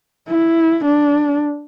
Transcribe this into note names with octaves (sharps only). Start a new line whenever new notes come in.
E4
D4